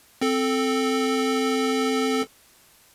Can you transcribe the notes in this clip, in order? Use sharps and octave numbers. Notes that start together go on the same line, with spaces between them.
C4 A4